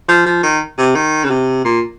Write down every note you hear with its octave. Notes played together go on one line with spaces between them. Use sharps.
F3
F3
D#3
C3
D#3
C#3
C3
A#2